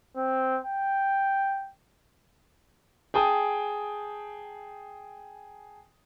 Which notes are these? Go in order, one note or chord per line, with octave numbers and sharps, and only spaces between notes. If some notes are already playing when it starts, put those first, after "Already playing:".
C4
G5
G#4 G5 A5 D#6